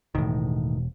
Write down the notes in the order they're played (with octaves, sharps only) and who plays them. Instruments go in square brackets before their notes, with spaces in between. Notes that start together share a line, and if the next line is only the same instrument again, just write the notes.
[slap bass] E1 [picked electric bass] A2 D#3